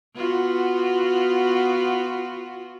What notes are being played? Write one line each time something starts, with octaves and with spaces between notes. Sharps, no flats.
B3 F4 F#4